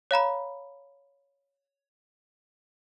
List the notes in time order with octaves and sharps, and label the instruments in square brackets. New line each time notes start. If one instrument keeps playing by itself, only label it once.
[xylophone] C#5 F5 A#5 B5